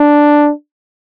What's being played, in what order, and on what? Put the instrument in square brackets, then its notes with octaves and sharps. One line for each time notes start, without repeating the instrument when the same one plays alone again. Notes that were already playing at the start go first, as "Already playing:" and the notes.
Already playing: [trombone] D4